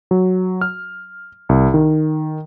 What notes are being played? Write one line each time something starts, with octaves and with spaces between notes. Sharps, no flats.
F#3
F6
C2
D#3